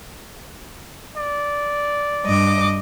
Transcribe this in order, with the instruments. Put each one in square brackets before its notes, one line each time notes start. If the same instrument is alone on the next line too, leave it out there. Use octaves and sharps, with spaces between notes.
[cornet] D5
[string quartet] G2 D#5 D6